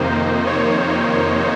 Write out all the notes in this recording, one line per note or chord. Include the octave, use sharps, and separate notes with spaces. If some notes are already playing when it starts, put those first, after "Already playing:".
Already playing: F2 C3 D#3 A#3 D#4 C5
C#5